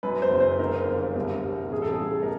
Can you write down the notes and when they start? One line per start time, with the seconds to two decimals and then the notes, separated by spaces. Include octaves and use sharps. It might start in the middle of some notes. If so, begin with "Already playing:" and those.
0.03 F#2 B4
0.22 C5
0.31 F#1
0.40 C5
0.59 D3 A#4
0.87 G1
1.15 C2
1.44 C2
1.72 A1 G#4
1.82 A4
1.93 G#4
2.00 G2
2.23 A#4